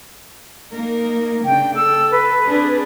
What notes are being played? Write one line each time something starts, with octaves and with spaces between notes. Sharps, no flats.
A#3 D#4 A#4
C#3 D4 G5
A4 E6
B4
C4 D4 G#4